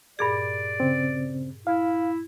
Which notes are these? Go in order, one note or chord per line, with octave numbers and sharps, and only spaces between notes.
G2 A#2 G#4 D5
C#3 C4
E4 F5